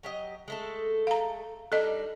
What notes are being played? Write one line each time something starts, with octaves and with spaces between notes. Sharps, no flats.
F#3 G4 D#5
G#3 A3 A4
F5 A#5
G3 D4 D#4 A4 D#5